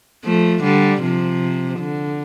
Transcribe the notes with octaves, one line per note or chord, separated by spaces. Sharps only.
F3 A3
D3 G3
C3 F3
D3